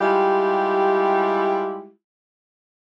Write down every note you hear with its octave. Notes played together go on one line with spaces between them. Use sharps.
G3 G#3 E4 F4 G4